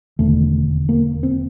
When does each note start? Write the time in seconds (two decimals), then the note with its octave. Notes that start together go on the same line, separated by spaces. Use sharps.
0.19 E1 D#2 D3 A3
0.89 A#3
1.23 C4